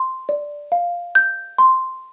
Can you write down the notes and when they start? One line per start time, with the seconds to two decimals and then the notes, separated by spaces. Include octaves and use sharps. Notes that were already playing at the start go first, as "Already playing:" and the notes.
Already playing: C6
0.29 D5
0.72 F5
1.15 G6
1.58 C6